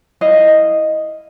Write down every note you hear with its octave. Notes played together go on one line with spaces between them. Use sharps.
E4 D#5 F5